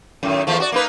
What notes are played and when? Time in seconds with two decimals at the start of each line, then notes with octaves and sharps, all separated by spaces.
0.23 F#2 A2 D#3
0.47 E2 F3 A3
0.60 F#4 D5
0.72 A#3 D#4 B4